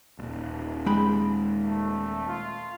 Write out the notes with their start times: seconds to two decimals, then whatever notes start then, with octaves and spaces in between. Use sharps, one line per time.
0.19 D#1 G#1
0.86 G#3 G5 B5
1.64 A3
2.28 F4